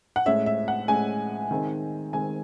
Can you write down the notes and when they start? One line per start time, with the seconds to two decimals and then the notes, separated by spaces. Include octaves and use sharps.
0.16 F#5
0.26 A2 G#3 C#4 E5
0.46 E5
0.68 F#5
0.88 A2 G#3 C#4 G#5
1.51 D#3 G#3 C4
2.13 D#3 G#3 C4 G#5